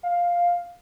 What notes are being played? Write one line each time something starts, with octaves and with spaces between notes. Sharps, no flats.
F5